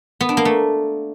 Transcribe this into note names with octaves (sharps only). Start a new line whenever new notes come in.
B3
D4
A#3
A3